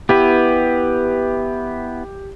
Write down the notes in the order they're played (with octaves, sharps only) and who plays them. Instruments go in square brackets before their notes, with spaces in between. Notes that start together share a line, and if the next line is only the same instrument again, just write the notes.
[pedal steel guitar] B3 E4 B4 [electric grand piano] G4